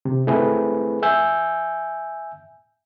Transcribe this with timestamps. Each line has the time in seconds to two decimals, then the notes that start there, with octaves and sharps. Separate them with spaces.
0.05 C3
0.27 A3 C4 E4 G#4 B4
1.03 E5 G#5 E6 G6